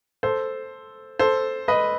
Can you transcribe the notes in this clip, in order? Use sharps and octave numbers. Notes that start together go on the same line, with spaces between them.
A4 C5
A4 C5
B4 D#5